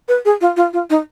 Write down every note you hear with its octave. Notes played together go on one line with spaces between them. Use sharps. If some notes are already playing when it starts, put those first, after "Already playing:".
B4
G#4
F4
F4
F4
D#4